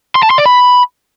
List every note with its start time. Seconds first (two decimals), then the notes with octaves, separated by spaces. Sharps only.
0.15 C6
0.23 A5
0.30 C6
0.38 D5
0.46 B5